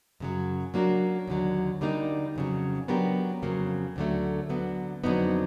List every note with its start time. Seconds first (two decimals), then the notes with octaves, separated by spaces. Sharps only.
0.20 F#2 C#3 F#3
0.74 F#3 A#3 D4 F#4 A#4
1.27 D#2 D3 F#3
1.81 D3 G3 A#3 D#4
2.36 F2 C#3 F#3
2.88 F#3 B3 D4 G4 A#4
3.42 F2 C#3 F#3 A#3
3.96 D2 D3 F#3 A3
4.49 D3 F#3 B3
5.04 F2 D3 F#3 B3 D#4